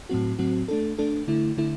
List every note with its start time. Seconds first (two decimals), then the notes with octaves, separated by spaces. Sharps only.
0.09 A2 F#3 C4 F#4
0.39 A2 F#3 C4 F#4
0.68 A3 D4 A4
0.98 A3 D4 A4
1.28 D3 A3 E4
1.57 D3 A3 E4